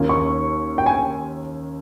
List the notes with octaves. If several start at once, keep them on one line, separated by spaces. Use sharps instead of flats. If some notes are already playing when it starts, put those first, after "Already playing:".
Already playing: D#2 D#3 A#3 C#4 F4
C#6
G5
G#5